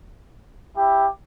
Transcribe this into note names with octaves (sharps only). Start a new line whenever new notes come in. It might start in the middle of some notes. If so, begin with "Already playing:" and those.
E4 G4